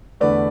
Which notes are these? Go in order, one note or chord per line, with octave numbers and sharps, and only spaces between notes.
E2 D3 A3 B4 D5